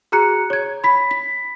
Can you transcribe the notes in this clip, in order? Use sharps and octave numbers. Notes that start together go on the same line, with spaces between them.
F#4 G#4 A#5 F#6 C#7
C#5 G#6
B5 B6
B6